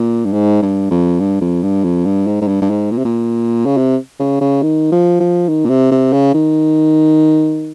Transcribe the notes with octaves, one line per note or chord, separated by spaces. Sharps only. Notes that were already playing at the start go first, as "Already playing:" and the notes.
Already playing: A#2
G2
G#2
G2
F2
G2
F2
G2
F2
G2
G#2
G#2
G2
G2
G#2
A#2
C3
A#2
C#3
C3
C#3
C#3
D#3
F3
F3
D#3
A#2
C3
C3
C#3
D#3